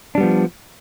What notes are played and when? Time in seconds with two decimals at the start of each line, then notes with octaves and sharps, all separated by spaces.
0.15 D4
0.18 G3
0.20 B3
0.23 F3